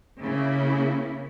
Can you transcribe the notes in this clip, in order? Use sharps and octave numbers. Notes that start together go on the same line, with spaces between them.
C#3 A#3 E4